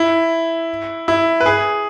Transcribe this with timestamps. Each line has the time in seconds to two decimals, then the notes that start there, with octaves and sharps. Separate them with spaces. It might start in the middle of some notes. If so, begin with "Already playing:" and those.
Already playing: E4
1.08 E4
1.40 B4
1.46 G#4